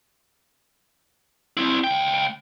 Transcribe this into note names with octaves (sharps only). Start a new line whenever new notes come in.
C4 E4
C#2 G5